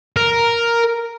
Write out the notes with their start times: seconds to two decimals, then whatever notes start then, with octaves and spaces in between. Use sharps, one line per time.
0.16 A#4